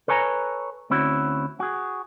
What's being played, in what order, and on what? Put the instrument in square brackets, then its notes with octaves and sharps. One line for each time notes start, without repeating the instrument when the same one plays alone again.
[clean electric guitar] A4 B4 C#5 G#5 A#5
D2 C4 C#4 E4 F#4
F#4 G#4